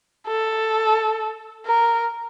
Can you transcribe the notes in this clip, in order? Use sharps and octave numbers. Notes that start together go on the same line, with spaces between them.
A4
A#4